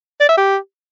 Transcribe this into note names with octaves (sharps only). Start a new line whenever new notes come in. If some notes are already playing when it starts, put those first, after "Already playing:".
D5
E5
G4